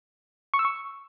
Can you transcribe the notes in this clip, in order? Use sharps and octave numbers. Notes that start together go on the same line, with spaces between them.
C#6
E6
C#6